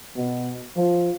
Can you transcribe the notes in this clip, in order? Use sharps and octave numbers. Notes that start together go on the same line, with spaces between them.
B2
F3